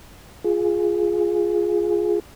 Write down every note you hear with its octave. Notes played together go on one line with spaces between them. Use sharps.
F4 G#4